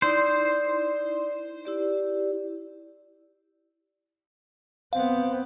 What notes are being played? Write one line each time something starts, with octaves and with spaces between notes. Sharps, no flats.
D#4 E4 C5 D5
E4 G4 D5
B3 C4 F5